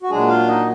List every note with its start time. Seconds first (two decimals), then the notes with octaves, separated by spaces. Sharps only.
0.03 F#4
0.10 A#2 F#3 G#3 D4 G#4
0.29 F4 F5
0.48 D#4 D#5